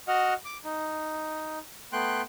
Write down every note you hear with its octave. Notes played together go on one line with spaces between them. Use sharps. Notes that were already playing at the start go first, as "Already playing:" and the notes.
F#4 D#5 F#5 F6
D6
D#4
A3 B3 G5 C6 F#6